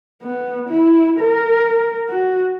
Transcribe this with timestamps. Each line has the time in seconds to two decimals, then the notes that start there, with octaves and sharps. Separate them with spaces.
0.23 B3
0.69 E4
1.20 A#4
2.09 F#4